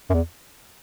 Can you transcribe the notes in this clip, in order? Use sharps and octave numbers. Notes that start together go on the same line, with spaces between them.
F#2
E2